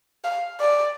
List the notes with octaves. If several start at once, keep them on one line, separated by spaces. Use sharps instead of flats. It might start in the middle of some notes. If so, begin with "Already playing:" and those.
F5
D5